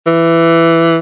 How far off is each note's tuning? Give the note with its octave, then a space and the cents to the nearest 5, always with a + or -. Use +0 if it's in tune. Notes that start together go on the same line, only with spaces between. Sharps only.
E3 +10